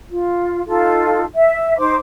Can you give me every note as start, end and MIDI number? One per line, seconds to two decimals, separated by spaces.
0.11 0.62 65
0.67 1.24 63
0.67 1.24 65
0.67 1.24 69
1.36 1.78 76
1.79 1.96 63
1.79 1.96 72
1.79 1.96 86